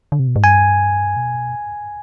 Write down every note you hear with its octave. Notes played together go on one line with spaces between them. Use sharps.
D3
C3
B2
G#2
G2 G#5
B2